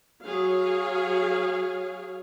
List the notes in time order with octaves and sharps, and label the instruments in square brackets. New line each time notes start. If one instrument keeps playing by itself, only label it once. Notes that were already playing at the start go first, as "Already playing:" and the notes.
[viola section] F#3 G#4 C#5 F5